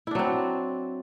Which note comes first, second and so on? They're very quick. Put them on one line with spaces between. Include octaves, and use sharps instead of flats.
E4 D4 F#3 C4